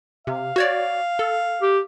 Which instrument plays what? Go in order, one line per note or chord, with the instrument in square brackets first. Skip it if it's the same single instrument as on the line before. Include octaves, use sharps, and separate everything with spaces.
[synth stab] C3 [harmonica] F5
[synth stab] F#4 C#5 D5
A4
[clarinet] G4